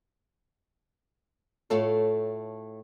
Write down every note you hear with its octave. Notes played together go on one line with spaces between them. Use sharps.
A2 A3 F4 A4 C#5